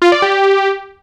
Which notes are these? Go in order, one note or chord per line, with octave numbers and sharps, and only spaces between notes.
F4
D5
G4